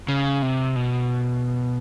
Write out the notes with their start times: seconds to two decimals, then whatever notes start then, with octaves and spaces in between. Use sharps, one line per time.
0.08 C#3
0.43 C3
0.76 B2